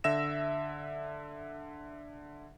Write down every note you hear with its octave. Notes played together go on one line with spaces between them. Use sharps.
D3 E5 E6 A#6 E7